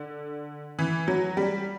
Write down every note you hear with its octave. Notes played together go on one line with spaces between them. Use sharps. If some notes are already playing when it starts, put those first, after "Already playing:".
Already playing: D3
E3
F#3
G3